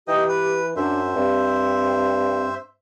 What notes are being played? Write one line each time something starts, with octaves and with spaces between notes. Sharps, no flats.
E3 D#4 G4 D#5 G5
B4
F#2 D4 C5 E5
G2 C4